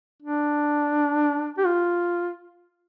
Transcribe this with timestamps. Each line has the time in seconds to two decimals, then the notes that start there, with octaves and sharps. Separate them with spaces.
0.22 D4
1.58 G4
1.65 F4